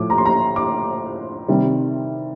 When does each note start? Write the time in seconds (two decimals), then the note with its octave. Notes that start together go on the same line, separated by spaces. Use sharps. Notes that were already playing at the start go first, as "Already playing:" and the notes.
Already playing: A2 F3 A3 D6
0.10 A#5
0.18 C6
0.26 A#5
0.56 D6
1.48 C3 D#3 G3